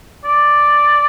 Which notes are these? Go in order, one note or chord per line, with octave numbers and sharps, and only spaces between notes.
D5